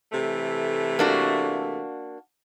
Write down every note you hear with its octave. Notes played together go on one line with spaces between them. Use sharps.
C3 E3 A3
A#3 D4 F#4